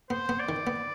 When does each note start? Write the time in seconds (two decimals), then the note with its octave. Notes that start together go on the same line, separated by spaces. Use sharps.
0.10 B3 C5
0.29 B3
0.39 D5
0.49 D#3
0.67 B3